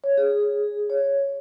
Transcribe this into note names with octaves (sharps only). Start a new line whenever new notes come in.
C#5
G#4
C#5